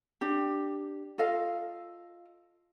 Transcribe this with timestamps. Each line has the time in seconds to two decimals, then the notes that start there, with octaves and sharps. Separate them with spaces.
0.21 D4 G4
1.18 F4 A4 D#5 F5